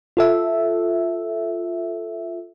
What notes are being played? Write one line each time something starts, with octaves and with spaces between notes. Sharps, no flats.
F4 A4 E5